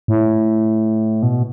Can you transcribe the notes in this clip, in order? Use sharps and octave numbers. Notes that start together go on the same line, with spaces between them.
A2
B2